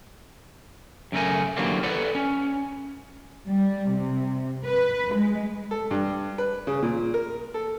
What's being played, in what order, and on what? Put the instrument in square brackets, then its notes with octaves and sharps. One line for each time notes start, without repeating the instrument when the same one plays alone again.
[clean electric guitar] F#2 C#3 A3 A#4 G#5
D3 E3 F#3 G3 A#3 C4
A4 B4 D5 F#5
C#4
[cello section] G3
C3
B4
G#3
[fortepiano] A4
G2
B4
C#3
A#2
A#4
A4